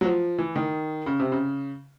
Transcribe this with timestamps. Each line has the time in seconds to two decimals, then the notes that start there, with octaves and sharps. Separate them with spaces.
0.01 F#3
0.05 F3
0.38 E3
0.56 D#3
1.06 C#3
1.20 C3
1.32 C#3